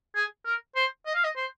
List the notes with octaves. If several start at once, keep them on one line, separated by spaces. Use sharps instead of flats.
G#4
A#4
C5
D#5
F5
D#5
C5